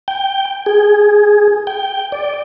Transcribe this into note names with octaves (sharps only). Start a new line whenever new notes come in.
G5
G#4
G5
D5